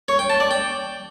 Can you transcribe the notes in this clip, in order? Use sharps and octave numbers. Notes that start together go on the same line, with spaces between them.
C#5
G5
A5
D5
G5